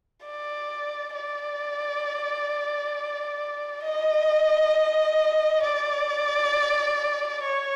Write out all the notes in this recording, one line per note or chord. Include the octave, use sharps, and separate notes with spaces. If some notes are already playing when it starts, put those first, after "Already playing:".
D5
D5
D#5
D5
C#5